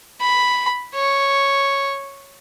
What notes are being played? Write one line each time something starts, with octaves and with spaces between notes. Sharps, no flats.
B5
C#5